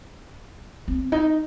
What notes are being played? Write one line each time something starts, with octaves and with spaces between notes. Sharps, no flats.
C4
D#4